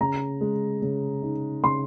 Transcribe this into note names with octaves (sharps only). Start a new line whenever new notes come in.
C#3 A#5
G#3
C#3
D#4
C#3 C6